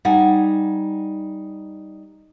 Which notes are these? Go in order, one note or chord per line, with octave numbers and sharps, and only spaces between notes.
G3 D#4 F#5 G#5